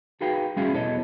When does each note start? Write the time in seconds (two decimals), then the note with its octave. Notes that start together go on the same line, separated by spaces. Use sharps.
0.21 D#4 F#4 G#4 B4 F5 G5
0.56 G3 C#4 E4 F#4 G#4 F5
0.72 E2 B2 E3 A4 C#5 D#5